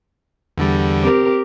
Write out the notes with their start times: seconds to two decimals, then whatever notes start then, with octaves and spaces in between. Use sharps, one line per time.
0.57 E2 D3 G3
1.01 C4 G4 A#4